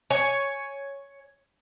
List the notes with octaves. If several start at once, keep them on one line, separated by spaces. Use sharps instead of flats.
C#5 G#5